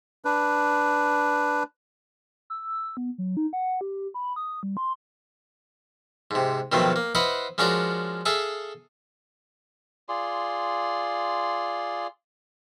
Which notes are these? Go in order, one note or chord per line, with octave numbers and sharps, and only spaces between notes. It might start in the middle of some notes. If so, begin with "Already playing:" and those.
D4 B4
E6
B3
F#3
D#4
F#5
G4
B5
D#6
G3
C6
G#2 C3
B2 D#3 F3 F#3 A3 C4
A#3
E4 B4 C5 D#5 F5 F#5
F3 G#3 C#4 D4 F#4 A#4
G#4 A4 E5 F5 G#5
F4 G#4 D5 C6